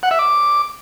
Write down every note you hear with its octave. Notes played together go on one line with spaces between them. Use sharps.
F#5
E5
D6